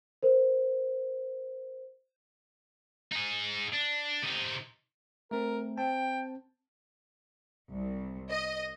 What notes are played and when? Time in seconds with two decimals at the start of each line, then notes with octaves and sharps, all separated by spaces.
0.23 A#4 C5
3.12 D#4 G#4
3.74 D4
4.23 C3 D#4
5.31 A3 C4 A#4
5.78 C4 G5 A5
7.70 C2
8.31 D#5